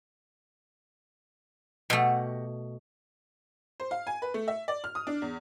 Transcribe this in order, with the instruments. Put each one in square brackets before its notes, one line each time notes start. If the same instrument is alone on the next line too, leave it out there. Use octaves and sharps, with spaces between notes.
[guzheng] B2 A3 [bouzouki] F#4 G4 F#5
[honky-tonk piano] C5
F5
G#5
B4
A3
E5
D5
F6
D#6
D4
E2